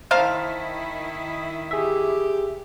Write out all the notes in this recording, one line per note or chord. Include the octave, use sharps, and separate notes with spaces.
D#3 E4 A#4 C5 F5 A5
G4 G#4 E5